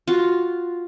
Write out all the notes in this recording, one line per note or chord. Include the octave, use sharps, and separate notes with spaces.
F4 F#4